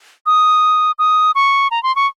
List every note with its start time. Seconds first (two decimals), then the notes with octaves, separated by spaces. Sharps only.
0.26 D#6
0.99 D#6
1.35 C#6
1.71 A#5
1.83 C6
1.96 C#6